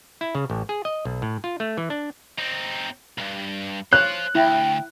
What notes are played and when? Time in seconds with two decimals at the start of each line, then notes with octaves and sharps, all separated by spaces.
0.21 E4
0.35 C#3
0.50 A1
0.69 G#4
0.85 D#5
1.05 B1
1.22 A2
1.44 F4
1.60 A3
1.77 E3
1.90 D4
2.38 C4 D#4
3.18 C#2 G2
3.93 C5 C#5 F5 F#6
4.35 D2 E4 G5